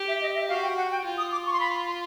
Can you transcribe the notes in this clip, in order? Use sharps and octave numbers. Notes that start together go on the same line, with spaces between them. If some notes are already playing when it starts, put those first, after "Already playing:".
Already playing: G4
E5
D#5
E5
F#4 F5
G5
F#5
G5
F4
D#6
D6
C#6
C6
B5
C6